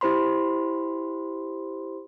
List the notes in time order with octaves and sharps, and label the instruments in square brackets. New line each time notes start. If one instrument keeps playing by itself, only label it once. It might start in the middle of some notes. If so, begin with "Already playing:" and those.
[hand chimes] E4 G4 C5 B5 C6